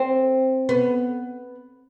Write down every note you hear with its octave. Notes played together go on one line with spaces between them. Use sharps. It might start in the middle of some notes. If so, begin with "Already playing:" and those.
Already playing: C4
B3